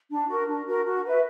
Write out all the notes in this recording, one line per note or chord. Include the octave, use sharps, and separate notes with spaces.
D4
F#4 A#4
D4
F#4 A#4
F#4
B4 E5